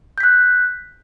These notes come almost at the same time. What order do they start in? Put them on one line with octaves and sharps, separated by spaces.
G6 B6 F#6